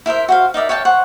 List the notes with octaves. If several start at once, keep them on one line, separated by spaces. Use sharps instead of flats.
E4 A#4 C5 E5
F#4 C5 F5
D#4 A#4 D5 E5
C#5 F5 G5 A5
C5 F#5 C#6